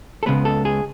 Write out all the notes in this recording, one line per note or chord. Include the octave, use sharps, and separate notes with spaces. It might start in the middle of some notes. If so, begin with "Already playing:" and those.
A4
C#2 C#3 G#3 B3 B4
A4
G#4